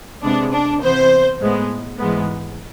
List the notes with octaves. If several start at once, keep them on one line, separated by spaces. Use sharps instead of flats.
C3 G#3 B3 D4
D4
C3 E3 B3 C5
A2 G#3 B3
G#2 E3 G#3 B3